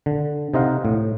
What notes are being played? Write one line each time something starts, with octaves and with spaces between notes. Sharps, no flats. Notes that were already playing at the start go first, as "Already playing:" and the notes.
D3
C3 D#4 C5 D#5 F5 F#5
A2